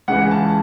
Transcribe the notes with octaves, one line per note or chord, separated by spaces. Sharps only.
C#2 C#3 E3 F#5
A5